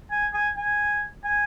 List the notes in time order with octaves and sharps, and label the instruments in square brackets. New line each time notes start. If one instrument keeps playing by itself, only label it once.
[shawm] G#5
G#5
G#5
G#5